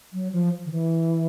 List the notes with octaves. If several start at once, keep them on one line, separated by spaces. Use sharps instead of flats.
F#3
F3
D#3
E3